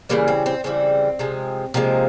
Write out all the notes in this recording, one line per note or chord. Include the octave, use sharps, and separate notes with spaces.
C#3 E3 G3 A#3
C4
C4
C#3 E3 G3 C4
C3 F3 G#3
C3 F3 G#3 A#3